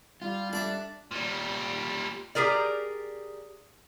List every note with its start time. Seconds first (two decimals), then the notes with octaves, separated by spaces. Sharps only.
0.22 G3 F4
0.53 D4 A4 D5 E5
1.11 A#2 G3
2.35 G4 G#4 A#4 D5